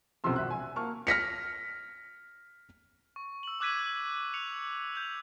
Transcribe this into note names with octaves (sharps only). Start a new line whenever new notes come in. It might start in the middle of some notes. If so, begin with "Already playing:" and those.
B1 F#2 C3 F3 C6 E6
G#1 E5 F#6
G#5
A#3 A5 C#6 F6
F6 A#6 B6 C#7
C#6
E6 F#7
D6 E6 F#6 G#6 B6 D#7
C#7 F7
G6 F7